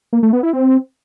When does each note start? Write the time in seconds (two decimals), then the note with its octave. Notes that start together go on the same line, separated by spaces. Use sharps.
0.13 A#3
0.23 A3
0.33 B3
0.43 E4
0.53 C4